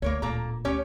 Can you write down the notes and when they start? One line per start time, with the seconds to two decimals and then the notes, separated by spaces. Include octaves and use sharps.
0.02 D2 A#3 A#4 C#5
0.22 D1 A#2 A#3 A4 A#5
0.65 D2 C#4 G4 C#5